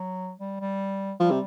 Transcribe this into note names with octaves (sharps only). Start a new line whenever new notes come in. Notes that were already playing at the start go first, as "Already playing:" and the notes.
Already playing: F#3
G3
G3
F3 G3
C3